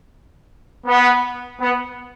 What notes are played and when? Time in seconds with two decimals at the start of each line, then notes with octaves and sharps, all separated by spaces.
0.86 B3
1.61 B3